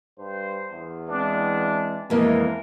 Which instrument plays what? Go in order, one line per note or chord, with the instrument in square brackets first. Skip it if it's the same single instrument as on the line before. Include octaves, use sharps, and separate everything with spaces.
[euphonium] G2 [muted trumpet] C5
[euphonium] E2
[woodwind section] E3 G#3 C4 [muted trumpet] D4
[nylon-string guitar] F2 A#3 [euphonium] E3 [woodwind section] G#3 B3 [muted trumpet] A#4